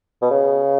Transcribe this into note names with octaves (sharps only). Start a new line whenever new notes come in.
B2
C#3